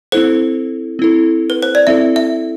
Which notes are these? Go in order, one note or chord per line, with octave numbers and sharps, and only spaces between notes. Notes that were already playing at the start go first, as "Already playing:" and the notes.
C4 E4 A4 C5
C4 E4 A4
B4
C5
D5
C4 E4 A4 E5
E5